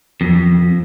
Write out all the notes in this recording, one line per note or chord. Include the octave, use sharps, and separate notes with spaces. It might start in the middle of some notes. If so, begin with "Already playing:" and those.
F2